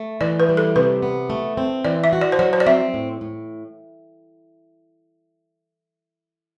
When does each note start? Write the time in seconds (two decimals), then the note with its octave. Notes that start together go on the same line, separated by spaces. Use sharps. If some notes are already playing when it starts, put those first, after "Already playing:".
Already playing: A3
0.21 E3 D5
0.40 B4
0.49 G3
0.57 A4
0.76 C3 B4
1.02 B3
1.30 A3
1.57 C4
1.85 E3 D5
2.04 E5
2.13 F#4
2.21 D5
2.32 C5
2.39 F#3 D5
2.53 C5
2.60 D5
2.67 C4 E5
2.94 A2
3.21 A2